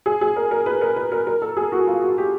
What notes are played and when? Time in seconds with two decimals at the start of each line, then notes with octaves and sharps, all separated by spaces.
0.06 G#4
0.21 G#4
0.36 A#4
0.51 A#4
0.66 B4
0.81 A#4
0.96 B4
1.12 A#4
1.27 A#4
1.42 A4
1.57 G#4
1.72 F#4
1.87 F4
2.02 F#4
2.18 G4